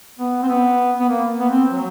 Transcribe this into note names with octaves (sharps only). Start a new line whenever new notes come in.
B3
C4
B3
B3
A#3
B3
C4
F#3